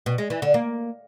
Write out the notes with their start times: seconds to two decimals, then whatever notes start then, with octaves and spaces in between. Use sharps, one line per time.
0.06 B2
0.18 G#3
0.30 E3
0.42 D3
0.54 A#3